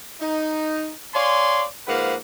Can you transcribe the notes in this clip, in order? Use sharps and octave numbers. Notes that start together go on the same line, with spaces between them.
D#4
C#5 D5 F5 G#5 C6
G#2 F3 A#3 B4 F5 F#5